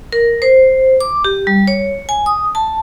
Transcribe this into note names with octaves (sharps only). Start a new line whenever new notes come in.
A#4
C5
D6
G4
G3
C#5
G#5
D#6
A5